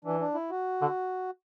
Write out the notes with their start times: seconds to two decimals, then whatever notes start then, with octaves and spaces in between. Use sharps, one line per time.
0.05 E3 D4
0.20 D4
0.34 E4
0.50 F#4
0.82 D3